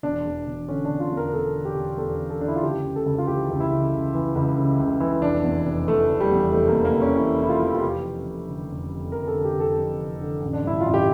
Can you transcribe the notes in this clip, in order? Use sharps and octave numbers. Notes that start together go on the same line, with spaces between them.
E1 D4
E2
E1
D3 C#4
D4
E1
F4
E2
A#4
E1 A4
D3
G4
E1
E2 A4
E1
A4
D3 D4
E4
F4
C#2 G4
C#3
A4
C#2
F4
E3 G4
C#2
E4
C#3
C#2
E3
C#2
C#3
C#2
E3
F1 D4
E2
F1
E3 A3
F1
G3
E2
F1 A3
A#3
E3
A#3
F1
C#4
E2 E4
F1 E4
F4
E3
E4
F4
F1 G4
F2
F1
D3
F1
F2
F1 A#4
A4
D3
G4
F1 A4
F2
F1
D3
A1
D4
G2 E4
A1 F4
G4